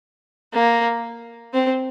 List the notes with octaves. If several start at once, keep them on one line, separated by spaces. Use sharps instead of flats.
A#3
C4